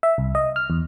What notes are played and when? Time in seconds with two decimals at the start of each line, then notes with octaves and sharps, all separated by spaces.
0.03 E5
0.18 C2
0.35 D#5
0.56 F6
0.70 E2